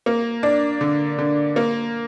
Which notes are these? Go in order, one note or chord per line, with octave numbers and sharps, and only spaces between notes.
A#3
D4
D3
D3
A#3